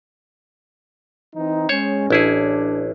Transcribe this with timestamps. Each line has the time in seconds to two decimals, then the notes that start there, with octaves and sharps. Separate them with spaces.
1.35 E3 C4 D#4
1.69 G#3 C#4 C5 C#5
2.10 A1 D4 E4 G#4